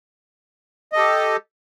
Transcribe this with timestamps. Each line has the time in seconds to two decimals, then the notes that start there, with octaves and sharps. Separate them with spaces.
0.93 D#5
0.95 A4
0.98 G4